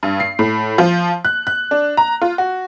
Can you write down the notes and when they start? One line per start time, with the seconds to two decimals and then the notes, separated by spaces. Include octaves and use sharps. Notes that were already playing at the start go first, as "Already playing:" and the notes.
0.03 G2
0.20 C7
0.39 A2
0.78 F3
1.25 F#6
1.47 F#6
1.71 D4
1.97 A#5
2.22 F4
2.38 F#4